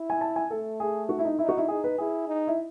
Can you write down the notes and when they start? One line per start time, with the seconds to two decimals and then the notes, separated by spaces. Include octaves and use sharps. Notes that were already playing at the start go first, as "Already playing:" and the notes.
Already playing: E4
0.10 G#5
0.21 A5
0.36 G#5
0.51 A3 A4
0.80 G#4
1.09 F#4
1.19 E4
1.25 D#4
1.39 D#4 E4
1.49 F#4
1.57 E4
1.68 D#4 G#4
1.84 B4
1.98 E4 G#4
2.28 D#4
2.47 E4